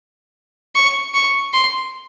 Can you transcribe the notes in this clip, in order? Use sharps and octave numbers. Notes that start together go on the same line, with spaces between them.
C#6
C#6
C6